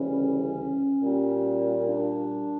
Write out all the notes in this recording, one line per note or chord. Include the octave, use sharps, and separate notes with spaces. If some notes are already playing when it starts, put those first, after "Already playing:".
Already playing: D2 C#3 E3 G3 C#4
A#2 G3
D4